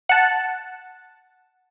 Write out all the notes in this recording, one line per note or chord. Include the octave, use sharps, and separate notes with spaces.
F#5 A5